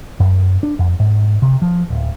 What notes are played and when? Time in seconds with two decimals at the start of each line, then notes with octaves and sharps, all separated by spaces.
0.20 F#2
0.63 D4
0.79 F2
1.00 G#2
1.42 C3
1.62 F3
1.90 D1